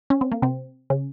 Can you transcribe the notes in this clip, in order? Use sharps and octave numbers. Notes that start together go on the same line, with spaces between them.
C#4
C4
A#3
C3 C4
C#3 C#4